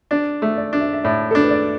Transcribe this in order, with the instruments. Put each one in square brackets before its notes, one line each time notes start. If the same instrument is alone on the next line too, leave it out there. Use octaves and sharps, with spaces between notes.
[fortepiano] D4 [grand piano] D5
[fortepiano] A3
[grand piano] D5
[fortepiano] D4
[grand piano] E5
E5
[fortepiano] A2 [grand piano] D5
[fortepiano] D4 [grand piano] A4
[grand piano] B4
D5